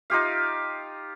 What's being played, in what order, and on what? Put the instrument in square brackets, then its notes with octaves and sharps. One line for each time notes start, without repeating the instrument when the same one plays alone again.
[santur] D#4 F4 G4 F5